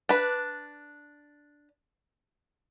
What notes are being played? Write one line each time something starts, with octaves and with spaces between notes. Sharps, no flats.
D4 B4